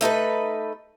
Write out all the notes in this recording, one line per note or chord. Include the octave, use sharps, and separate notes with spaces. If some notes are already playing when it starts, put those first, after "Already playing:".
A3 D#4 A4 B4